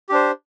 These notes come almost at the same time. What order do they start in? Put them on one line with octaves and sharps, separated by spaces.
G4 D4 C5